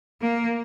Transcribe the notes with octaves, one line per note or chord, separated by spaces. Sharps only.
A#3